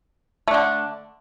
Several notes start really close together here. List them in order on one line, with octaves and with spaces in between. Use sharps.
A3 D4 D3